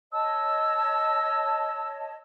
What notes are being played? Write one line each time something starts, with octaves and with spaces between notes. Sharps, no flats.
C#5 D#5 A5 E6